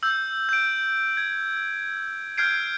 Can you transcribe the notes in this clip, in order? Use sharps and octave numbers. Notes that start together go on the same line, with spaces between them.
E6 G6
G6 D7
G#6
F6 G6 G#6 C7 D7